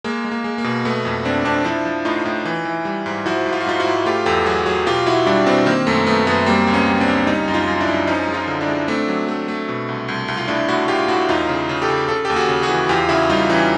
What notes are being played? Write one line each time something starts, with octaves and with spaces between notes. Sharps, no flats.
G#3 A#3
G#3
A#3
G#3
A#3
B2
A3 B3
F2
F2 C4 D4
F2 C4 D4
F3 D4 E4
F3
A2 D#4 F4
A2
E3
E3
G3
G#2
F3 E4 F#4
G#2
F4
F#4
G#2 D#4 F4
E4 F#4
G#2
A3 F4 G4
E2 G4 A4
F#3 F#4 G#4
F#3 F#4 G#4
B2 F4 G4
B2 E4 F#4
G3 D4 E4
B2 C4 D4
D#3 A#3 C4
F#2 A3
F#2 A3 B3
F#2 A3 B3
G3 A#3 C4
C#2
B3 C#4
G3
C4 D4
C#2
G3 C#4 D#4
F#2
D#4 F4
F#2
D4 E4
F#2
F3 C#4 D#4
G#3
D#4 F4
D3
D4 E4
G#3
A3 C4 D4
F#3
A3
A3
B2
C2
C2
C2
F4
A2 D4 E4
A2 E4 F#4
A2 F4 G4
A2 E4 F#4
E2 D#4 F4
C#3
C#3
G4 A4
C#3
C#3 A4
D#2 G4 A4
F#4 G#4
C#3
F#4 G#4
E3
E2 F4 G4
C#3 E4 F#4
G3 D#4 F4
E3 C#4 D#4